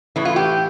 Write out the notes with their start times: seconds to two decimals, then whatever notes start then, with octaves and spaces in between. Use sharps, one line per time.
0.16 A2 E3
0.25 F4
0.36 G4